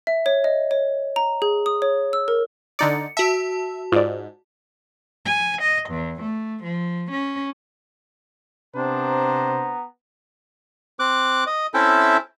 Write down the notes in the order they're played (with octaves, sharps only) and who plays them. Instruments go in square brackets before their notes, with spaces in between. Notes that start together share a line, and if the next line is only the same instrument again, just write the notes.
[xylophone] E5
C#5
D#5
C#5
A#5
G#4
D#6
C#5
E6
A#4
[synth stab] D3 D#4 D5 [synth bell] C#7
[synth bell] F#4 A5 [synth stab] E5
[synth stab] G#2 [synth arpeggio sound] F4 D5
[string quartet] G#5
D#5
E2
A3
F3
C#4
[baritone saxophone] C3 [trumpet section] B3 A#5 [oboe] D4 [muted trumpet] C5
[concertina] C4 D6 F#6
D#5
C4 C#4 E4 A4 E5 G5